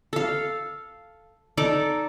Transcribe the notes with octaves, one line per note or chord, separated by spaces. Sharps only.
A4 F5
D#4 A4 D5